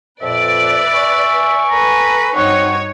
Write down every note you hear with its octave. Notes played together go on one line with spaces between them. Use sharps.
F2 A#2 B4 D5 E5
G#5 C#6
A4 B4 A#5
G2 C4 D#4 F#4 C#5 F#5 C#6